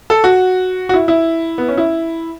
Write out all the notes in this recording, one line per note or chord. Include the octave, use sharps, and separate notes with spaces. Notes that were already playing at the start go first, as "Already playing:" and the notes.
A4
F#4
F#4
E4
E4
B3
C#4
E4